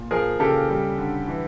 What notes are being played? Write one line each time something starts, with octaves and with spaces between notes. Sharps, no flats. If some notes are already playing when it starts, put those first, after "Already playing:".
Already playing: A#2
F3 G#4 A#4
C#3 G4 A4
G3
D3
E3